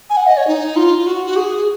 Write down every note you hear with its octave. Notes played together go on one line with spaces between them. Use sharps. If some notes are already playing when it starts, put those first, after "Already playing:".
G#5
F#5
D#5
C#5
D#4
F4
F4
F#4
F#4
G#4